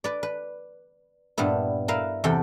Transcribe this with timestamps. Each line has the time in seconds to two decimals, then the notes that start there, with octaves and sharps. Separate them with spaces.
0.04 B4 D5
0.23 B4
1.38 G2 A#2 G3 B3 E4
1.88 E4 A#4 B4 E5 F5
2.24 E2 C3 A4 F#5 G5